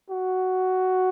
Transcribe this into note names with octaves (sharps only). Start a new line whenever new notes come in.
F#4